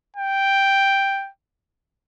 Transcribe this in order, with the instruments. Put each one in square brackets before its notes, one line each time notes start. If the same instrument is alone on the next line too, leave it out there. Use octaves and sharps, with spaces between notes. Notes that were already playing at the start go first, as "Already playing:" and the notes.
[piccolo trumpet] G5